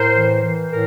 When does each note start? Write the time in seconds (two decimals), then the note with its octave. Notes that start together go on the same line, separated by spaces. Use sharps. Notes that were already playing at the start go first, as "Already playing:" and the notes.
Already playing: A2 A#4 C5
0.17 E3
0.44 E3
0.71 A2 A#4